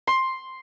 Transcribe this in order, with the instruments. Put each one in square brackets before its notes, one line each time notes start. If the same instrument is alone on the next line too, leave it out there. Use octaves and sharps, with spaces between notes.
[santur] C6